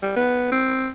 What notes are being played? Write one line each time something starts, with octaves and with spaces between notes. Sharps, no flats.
G3
B3
C4